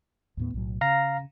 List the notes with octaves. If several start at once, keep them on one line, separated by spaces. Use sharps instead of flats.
D#2 A2 B3
B1 A2 F#3
C#3 F5 A#5 A#6